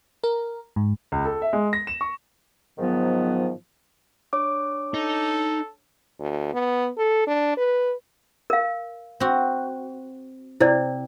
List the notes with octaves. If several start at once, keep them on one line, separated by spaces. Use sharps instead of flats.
A#4
G#2
C#2
A4
E5
G#3
A#6
E7
C#6
G#2 D#3 F3 F#3 B3
D4 C#5 D6
D#4 A4
D2
B3
A4
D4
B4
A#4 F5
C4 F#4
C3 E4 C5 D5